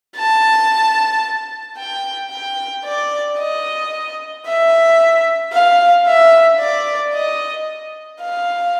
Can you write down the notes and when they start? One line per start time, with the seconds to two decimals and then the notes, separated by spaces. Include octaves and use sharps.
0.16 A5
1.77 G5
2.31 G5
2.84 D5
3.38 D#5
4.45 E5
5.53 F5
6.07 E5
6.60 D5
7.14 D#5
8.21 F5